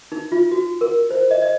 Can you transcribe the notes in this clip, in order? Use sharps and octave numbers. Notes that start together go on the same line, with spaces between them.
D#4
F4
F#4
A#4
C5
D#5
D#5